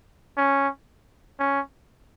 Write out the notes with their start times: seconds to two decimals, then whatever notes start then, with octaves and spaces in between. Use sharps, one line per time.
0.37 C#4
1.39 C#4